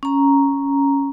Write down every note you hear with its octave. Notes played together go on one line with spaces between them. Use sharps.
C#4 A#5